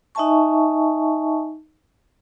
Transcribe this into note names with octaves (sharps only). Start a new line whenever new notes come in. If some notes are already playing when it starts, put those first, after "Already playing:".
D#4 D#5 E5 G#5 A5 C#6